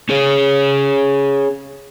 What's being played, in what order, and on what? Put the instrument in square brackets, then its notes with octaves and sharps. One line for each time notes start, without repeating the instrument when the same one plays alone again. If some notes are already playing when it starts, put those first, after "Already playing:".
[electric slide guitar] C#4 G#4 C#5